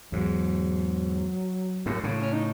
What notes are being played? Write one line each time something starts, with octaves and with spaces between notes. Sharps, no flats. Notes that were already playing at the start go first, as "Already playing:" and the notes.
E2 G#2 F#3
F#2 A2
A2 C#3
C#4
D#4